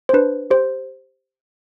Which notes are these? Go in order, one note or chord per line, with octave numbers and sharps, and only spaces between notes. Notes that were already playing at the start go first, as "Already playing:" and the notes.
C5
D4 B4
G4 C5